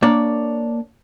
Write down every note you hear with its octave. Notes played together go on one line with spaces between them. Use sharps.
A#3 D4 C#5 D5